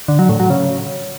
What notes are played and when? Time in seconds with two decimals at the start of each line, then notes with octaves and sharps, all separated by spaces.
0.08 D3
0.19 F#3
0.29 A2
0.40 F#3
0.50 C#3